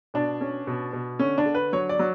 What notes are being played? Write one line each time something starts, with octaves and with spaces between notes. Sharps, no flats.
B2 D4
C#4
B2
B2
D3 C#4
D4
D3
B4
F#3 C#5
D5
F#3